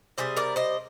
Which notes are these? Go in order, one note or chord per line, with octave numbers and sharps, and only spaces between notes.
C3 G3 G#4 C5
A#4 D5
C5 D#5